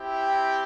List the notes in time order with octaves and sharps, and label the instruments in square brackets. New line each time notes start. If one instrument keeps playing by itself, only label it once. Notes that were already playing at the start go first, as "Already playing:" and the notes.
Already playing: [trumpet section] C4 E4 G4
G5